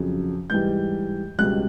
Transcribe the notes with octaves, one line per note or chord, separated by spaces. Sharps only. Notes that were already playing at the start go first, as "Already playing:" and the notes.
Already playing: F2 C#3 F#3
G#2 E3 G3 G6
C#2 B2 G3 F#6